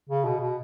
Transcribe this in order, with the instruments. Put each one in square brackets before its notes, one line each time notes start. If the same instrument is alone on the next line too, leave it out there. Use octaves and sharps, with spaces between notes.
[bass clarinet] C#3
B2
B2